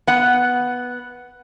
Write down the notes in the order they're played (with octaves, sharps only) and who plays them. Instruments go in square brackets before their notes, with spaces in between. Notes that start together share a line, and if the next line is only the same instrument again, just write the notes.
[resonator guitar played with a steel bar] B3 F#5